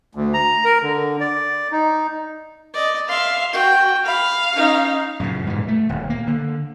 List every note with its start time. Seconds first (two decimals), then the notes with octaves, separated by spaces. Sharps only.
0.15 D2
0.34 A#5
0.65 A#4
0.82 D3
1.20 D5
1.72 D#4
2.74 D5 D#5
3.09 E5 F5 C6
3.53 F#4 G5
4.05 F5 B5
4.53 C#4 D#4
5.20 F#2 A#2 C#3
5.47 G#2 B2 E3
5.68 A3
5.89 D#1 D2
6.10 A#3
6.27 D3